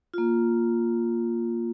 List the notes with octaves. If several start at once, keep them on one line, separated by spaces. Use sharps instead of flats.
A#3 F4